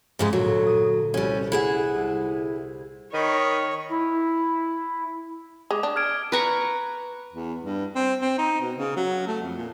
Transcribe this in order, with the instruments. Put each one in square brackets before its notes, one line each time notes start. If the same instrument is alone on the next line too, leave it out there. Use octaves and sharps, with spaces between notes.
[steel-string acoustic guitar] G#2 C#3 G#3
[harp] D2 A#2 A4 [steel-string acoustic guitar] F#3
[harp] D#6 D#7
[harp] C2 [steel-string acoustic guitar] G3 C#4
[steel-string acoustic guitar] E4 G#4 F#5
[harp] C2
[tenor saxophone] D#3 [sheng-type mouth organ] A#4 D#5 B5 [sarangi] C#5
[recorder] E4
[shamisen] G#3 [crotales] D6 D#6
[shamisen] D4
[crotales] F6 G#6 D7
[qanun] B4 A#5 C#6
[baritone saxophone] E2
G2
C4
C4
D#4
B2
C#3
F#3
A3
F2
A#2